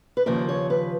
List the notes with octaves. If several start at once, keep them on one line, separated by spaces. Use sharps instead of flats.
B4
D#2 C#3 F3 A#4
C#5
B4